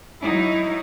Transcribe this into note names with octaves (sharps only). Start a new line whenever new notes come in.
F#3 D#4 E4